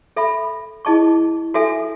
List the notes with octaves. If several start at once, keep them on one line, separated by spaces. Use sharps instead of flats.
A4 E5 B5
E4 G#4 D#5 A5 C#6
F#4 A4 E5 G#5